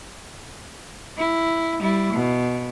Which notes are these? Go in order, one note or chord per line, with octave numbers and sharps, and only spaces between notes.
E4
G3 E4
B2